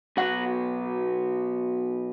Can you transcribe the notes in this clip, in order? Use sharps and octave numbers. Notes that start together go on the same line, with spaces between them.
B2 F#3 B3 F#4 F#5